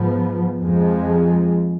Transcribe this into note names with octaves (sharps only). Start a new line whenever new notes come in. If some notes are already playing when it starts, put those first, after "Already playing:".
Already playing: G#2 F3 B3
F2 F3 G#3